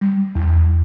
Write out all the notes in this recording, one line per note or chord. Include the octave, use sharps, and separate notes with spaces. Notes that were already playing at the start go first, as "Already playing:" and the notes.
G3
E2